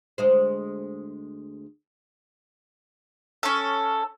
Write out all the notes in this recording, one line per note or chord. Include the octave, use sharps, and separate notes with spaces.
D2 G#3 C5
C#4 A4